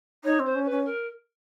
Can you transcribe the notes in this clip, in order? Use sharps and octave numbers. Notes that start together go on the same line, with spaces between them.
D#4 C#5
C4
C5
C#4
B4
C#4
A#4